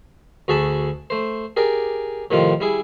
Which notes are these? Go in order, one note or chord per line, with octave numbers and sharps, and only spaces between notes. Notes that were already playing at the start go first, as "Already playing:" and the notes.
D2 F#4 G#4 A4 A5 B5
A3 C5
G4 G#4 A#4 D5
A2 C3 D#3 F3 C4 F4
G3 E4 G#4